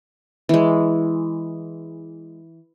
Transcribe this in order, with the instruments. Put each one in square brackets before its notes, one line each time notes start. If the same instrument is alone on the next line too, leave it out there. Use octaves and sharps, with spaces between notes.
[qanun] E3 G#3